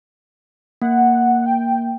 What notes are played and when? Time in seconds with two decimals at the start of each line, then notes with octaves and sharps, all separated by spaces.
0.82 A#3 F#5
1.46 G5